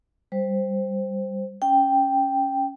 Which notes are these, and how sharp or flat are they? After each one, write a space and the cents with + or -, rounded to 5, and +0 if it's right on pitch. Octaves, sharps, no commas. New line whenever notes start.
G3 +0 C5 +0
C#4 +0 G5 +0